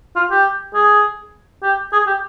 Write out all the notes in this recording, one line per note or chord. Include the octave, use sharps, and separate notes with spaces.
F4
G4
G#4
G4
G#4
G4